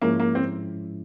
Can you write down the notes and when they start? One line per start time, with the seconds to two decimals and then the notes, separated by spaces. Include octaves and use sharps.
0.02 G#2 F3 G#3 A#3 C#4 E4
0.20 A#3
0.35 C4